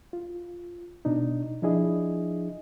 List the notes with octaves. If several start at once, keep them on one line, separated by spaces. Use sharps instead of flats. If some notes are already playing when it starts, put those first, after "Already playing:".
F4
B2 D4 D#4
F3 D4 E4 G#4 D#5